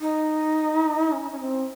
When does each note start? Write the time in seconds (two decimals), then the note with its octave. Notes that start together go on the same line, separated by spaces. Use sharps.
0.01 D#4
1.12 C#4
1.31 C#4
1.40 C4